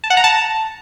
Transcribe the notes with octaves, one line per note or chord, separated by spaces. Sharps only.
A5
F#5
A#5
A5